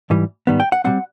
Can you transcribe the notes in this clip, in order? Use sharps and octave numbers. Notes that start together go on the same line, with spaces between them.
G#2 E3 G3
G#2 D#3 G3 B3
G5
F#5
B2 G3 C4 F#5